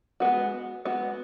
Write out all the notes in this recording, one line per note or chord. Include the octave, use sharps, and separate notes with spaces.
G#3 B3 F#4
G#3 B3 F#4